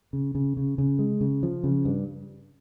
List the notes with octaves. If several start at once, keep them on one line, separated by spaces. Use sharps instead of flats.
C#3
C#3
C#3
C#3
G#3
C#3
F3
C#3
G2